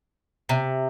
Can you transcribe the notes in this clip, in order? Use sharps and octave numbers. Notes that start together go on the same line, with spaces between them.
C3